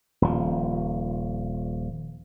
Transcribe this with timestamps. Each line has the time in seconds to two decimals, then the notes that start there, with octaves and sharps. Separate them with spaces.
0.22 D#1 F3